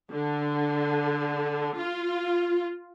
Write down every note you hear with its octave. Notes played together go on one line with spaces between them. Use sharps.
D3
F4